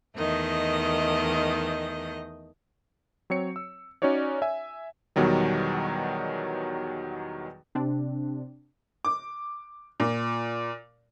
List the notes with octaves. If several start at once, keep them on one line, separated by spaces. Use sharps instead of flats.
E2 D#3 A3 D#5
F#3 C4 C#5 C#7
E6
C#4 D#4 F#4 C#5 D5
E5 G#5
E2 B2 D#3 F#3 G3
C3 C4 D4
D6
A#2